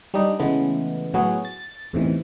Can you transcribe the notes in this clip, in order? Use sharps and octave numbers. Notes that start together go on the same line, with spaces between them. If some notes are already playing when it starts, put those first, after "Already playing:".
G3 D4 D#4
C#3 E3 G#3 A3 B3
A2 F#3 B3 F#4 G#4
A6
E2 A2 C3 D#3 E3